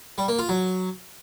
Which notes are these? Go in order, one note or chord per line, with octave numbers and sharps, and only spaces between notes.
G3
A#3
F4
F#3